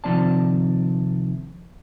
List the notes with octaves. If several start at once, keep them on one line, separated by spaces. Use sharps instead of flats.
C3 D#3 F3 C4 D5 A5